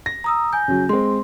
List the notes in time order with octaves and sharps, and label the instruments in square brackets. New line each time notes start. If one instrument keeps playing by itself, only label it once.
[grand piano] A#6
[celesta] A#5 D#6 E6
G#5 G6
[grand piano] C#3 F#3
[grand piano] G#3 C4 [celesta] C6